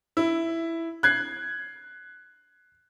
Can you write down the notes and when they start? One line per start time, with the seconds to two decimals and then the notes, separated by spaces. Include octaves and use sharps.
0.17 E4
1.03 F#6 G#6 C7